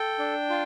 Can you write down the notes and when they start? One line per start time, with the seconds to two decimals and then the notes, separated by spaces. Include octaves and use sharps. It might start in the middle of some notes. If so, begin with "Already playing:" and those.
Already playing: A4 G5
0.19 D4
0.50 F4